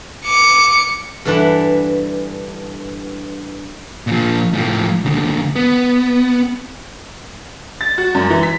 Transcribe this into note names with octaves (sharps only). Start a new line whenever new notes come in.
D6 C#7
G2 D3 E3 D4 B4
A#2 F3
A2 F3
D#2 D3
B3
A6
F#4
F#2
E3
B6